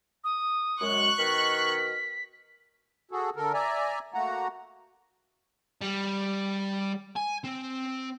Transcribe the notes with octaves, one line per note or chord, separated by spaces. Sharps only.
D#6
F#2 G#3 C#6 F#6
B2 D#3 A#4 B6
F#4 G#4 A4
D3 A4 A#4
D5 E5 G#5 A#5
A3 A#3 F#4 F#5 A#5
G3
G#5
C4